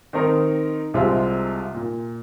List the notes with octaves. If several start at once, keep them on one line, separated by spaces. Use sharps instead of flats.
D#3 C4 D#4 A#4
C2 C3 G#3 C4 F4
A#2